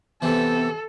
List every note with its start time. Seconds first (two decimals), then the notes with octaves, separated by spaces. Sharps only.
0.22 C3 E3 B3 A4